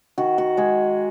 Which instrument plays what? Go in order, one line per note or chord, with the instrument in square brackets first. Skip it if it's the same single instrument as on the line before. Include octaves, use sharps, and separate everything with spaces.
[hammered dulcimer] D#3 F#4
F#4
G#3 G#4